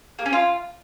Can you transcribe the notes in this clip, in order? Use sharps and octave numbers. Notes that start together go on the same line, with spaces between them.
A#3
C#4
F4